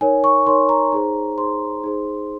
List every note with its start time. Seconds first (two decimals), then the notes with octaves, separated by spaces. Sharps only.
0.01 D#4 A#4 C#5 G#5
0.24 C#6
0.47 D#4 A#4 C#5 C6
0.69 A#5
0.92 D#4 G#4 C5
1.38 D#4 G#4 C5 C6
1.84 D#4 G#4 C5